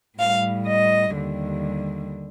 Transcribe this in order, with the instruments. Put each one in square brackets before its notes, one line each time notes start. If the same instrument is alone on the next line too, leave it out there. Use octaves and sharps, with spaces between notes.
[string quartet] A2 G3 F5
D#5
D#2 D3 G3